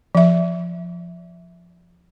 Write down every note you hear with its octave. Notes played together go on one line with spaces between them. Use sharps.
F3 E5